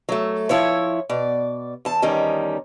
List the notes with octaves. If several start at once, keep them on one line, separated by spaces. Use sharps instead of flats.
F#3 A3
F3 E4 C#5
B2 D5
E2 A5
E2 D#3 G3 C#4 D#5